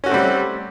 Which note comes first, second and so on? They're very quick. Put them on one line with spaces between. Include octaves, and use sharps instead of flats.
C#4 F#4 A3 C4 G3